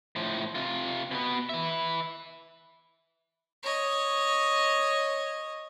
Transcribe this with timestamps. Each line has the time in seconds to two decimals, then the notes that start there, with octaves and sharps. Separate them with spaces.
0.16 A2 F3
0.55 C3 F4
1.11 B2 B3
1.49 B4 E5
3.63 C#5 D#5